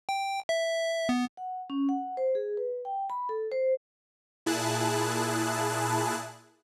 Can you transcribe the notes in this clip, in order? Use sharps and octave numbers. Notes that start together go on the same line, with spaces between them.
G5
E5
B3
F#5
C#4
F#5
C5
G#4
B4
G5
B5
A4
C5
A#2 E4 G#4 A5 F#6